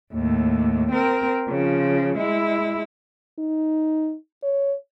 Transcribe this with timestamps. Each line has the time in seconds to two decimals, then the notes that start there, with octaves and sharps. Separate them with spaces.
0.14 D#2 A2
0.92 C4 A#4
1.49 C#3 F3
2.17 G#3 E4
3.38 D#4
4.43 C#5